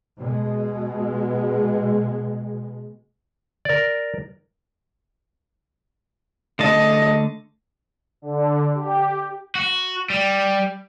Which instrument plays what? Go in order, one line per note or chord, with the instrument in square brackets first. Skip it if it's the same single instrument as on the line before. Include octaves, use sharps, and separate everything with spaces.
[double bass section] B2 G#3
[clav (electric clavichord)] A#4 D5
[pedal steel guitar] D3 A3 A5 [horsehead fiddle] D#5
[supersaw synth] D3
G4
[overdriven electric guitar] F#4
G3